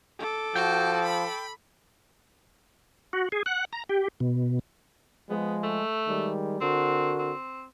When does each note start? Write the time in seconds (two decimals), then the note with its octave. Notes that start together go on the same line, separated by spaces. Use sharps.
0.19 A4 D6
0.56 F3 F#4 G5
1.04 B5
3.13 F#4
3.32 G#4
3.46 F#5
3.73 A#5
3.89 G4
4.20 B2
5.30 F3 G#3 B3
5.63 A3
6.08 D#3 G3 G#3
6.61 D3 C4 F#4 A#4
7.18 C4